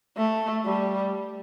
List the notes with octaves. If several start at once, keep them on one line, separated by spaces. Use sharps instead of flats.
A3
G3